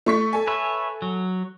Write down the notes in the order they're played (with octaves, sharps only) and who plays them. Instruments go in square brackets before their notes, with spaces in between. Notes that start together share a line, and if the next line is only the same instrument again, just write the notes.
[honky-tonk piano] A3 C#6 B6
A4 G#5
[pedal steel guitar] B4 C#5 E5
F#3